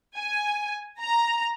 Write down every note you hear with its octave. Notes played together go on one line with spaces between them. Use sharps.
G#5
A#5